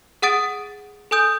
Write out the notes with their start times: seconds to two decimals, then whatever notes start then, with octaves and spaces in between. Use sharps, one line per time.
0.22 G#4 F#5 D#6 A6 D7
1.11 A4 G#5 D#6 G6